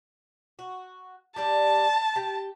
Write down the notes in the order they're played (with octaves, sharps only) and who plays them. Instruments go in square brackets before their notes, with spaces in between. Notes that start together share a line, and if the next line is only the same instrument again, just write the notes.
[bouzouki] F#4
[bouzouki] G3 D4 G4 [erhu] A5
[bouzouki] G4 G5